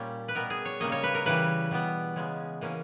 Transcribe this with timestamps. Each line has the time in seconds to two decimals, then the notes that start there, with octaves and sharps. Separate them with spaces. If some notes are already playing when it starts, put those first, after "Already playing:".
Already playing: A#2 G3 A#3 C#4
0.28 B4
0.35 B2 G3 B3 A#4
0.50 G#4
0.65 C#5
0.80 C#3 G3 A#3 C#4 D#5
0.92 C#5
1.03 B4
1.15 A#4
1.25 C#3 E3 G3 B4
1.71 B2 G3 B3
2.16 C#3 G#3 C#4
2.61 E3 A#3 C#4